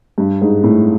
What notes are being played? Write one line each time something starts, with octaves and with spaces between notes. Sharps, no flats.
G2
G#2
A2